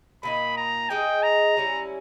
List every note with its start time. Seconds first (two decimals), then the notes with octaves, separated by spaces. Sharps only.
0.23 A#2 A#3 D#4 B5
0.57 A#5
0.90 G#3 D#4 G#4 G5
1.23 A#5
1.57 G3 C#4 E4